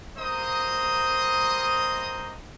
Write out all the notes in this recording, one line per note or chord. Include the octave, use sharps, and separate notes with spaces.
G3 A#3 C5 D#5 A#5 D#6